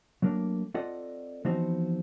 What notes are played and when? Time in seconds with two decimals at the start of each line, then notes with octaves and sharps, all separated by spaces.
0.22 F#3 A3 A#3 D4
0.74 C4 F4 A4 D5 D#5 F#5
1.45 E3 F3 B3 C4 D#4 F#4